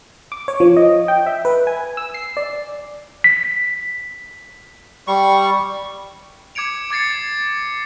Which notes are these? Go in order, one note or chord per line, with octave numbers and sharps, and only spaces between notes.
D6
C#5
F3
D#5
G5
E5
B4
G#5
E6
C7
D5
B6
G3 C#6
D6 G#6 C#7 D7 F7
D6 G#6 A6 C7 C#7